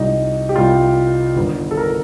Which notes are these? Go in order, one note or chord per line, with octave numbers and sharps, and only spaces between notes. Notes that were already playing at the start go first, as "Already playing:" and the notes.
Already playing: C2 A#2 G3 D#4
G4
C2 A#2 G3 F4
G1 G2 D#3
A4
A#4